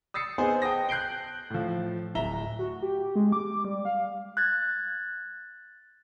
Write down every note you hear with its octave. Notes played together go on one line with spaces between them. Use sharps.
D#6 E6 A6 C7 C#7
B3 D#4 G#4 C5 G#5
G5 A5 D#6 A#6
F#6 G6 C7 D7 G7
A2 F3
D1 E5 A#5 G7
F#4
G4
G#3
D6
G3
F5
F#6 G#6 A6